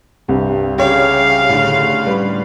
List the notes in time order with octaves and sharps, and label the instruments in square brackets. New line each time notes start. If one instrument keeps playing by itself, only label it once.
[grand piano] C2 [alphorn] G2
[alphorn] C#3 [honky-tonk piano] G4 C#5 [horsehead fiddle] F5
[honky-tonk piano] A2 D3
[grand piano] G3 B4